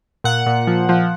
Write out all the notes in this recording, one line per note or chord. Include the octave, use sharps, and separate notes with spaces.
A#2 F#5
A#2
F3
F3